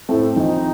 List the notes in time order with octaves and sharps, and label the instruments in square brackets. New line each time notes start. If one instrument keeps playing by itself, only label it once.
[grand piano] A2 A3 [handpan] C4
[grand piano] A#1 [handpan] D#4